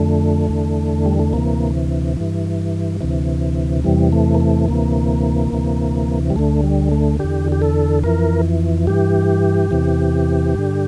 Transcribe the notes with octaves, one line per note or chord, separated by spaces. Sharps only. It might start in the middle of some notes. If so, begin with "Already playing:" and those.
Already playing: F2 D3 A3
E2 D3
G3
A3
D2 C3 E3 A#3
G2 E3
D2 C3 E3
E2 C3 E3 G3
A3
A#3
A3
D2 C3 E3 A#3
D2 C3 E3
G3
D2 D3 A3
G3
A3
E2 D3 G4
G4
A4
F2 E3 A#4
G2 E3 G4
E2 C3 E3
G2 D3